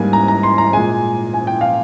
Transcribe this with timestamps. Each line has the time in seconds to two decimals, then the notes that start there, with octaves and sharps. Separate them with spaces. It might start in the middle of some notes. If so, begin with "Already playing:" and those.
Already playing: G#2 G3 A#3 G#5
0.13 A#5
0.28 A#5
0.43 C6
0.58 A#5
0.73 A#2 G#3 G#5
1.34 G#5
1.47 G5
1.61 F5